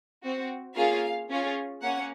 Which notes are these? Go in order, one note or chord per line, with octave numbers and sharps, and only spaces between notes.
C4 F#4
A#3 C#4 F4 G#4 F5
C#4 F4 G#4
A#3 C#4 F#5